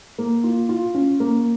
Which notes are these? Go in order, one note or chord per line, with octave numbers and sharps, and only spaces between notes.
A#3
F4
F4
C#4
A#3